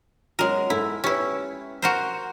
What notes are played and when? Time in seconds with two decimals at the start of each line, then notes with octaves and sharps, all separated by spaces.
0.39 F#3 G#3 C#4 F#4 A#4
0.70 G#2 E4 A4
1.04 C#4 E4 G4 B4 C#5
1.82 F#4 A#4 C5